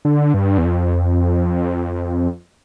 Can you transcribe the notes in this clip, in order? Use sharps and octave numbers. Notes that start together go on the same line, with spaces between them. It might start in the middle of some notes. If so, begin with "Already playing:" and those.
D3
G2
E2
F2